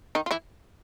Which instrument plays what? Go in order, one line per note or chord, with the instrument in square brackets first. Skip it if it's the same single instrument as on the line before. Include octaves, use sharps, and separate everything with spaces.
[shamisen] D#3 D#4
F4
E3 E4